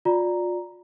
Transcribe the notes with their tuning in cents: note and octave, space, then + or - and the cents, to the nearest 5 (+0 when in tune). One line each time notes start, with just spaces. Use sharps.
F4 +35 D5 +0 A#5 +0